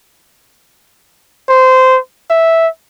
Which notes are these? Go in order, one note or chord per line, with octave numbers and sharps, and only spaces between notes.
C5
E5